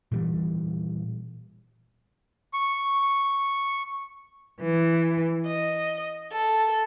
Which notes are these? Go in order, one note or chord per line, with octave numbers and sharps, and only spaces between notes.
A#2 E3 G3
C#6
E3
D#5
A4